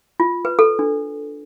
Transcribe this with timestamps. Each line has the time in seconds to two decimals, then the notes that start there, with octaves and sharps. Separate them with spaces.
0.20 F4
0.45 B4
0.59 A4
0.79 D4